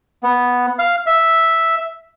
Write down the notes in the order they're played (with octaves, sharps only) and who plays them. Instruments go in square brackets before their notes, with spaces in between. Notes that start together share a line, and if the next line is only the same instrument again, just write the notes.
[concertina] B3
F5
E5